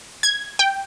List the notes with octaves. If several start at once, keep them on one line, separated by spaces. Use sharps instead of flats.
G#6
G5